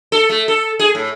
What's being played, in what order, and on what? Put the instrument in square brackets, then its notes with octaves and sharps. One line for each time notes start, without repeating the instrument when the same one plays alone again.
[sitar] A4
A3
A4
G#4
A2